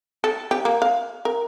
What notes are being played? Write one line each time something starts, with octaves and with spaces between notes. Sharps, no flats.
A4
G4
A#3
F5
A#4